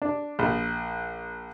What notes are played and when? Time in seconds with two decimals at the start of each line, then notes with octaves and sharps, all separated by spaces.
0.02 D4
0.39 A#1